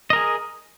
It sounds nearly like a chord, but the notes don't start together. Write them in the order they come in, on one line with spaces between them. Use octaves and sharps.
D#5 A#4 G#4